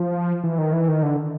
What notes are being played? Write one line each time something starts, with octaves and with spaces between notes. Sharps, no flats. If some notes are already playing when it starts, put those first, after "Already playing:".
Already playing: F3
E3
D#3
E3
D#3
D3